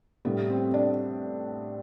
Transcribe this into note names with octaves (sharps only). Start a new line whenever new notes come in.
A2 G3 B3
C4
D4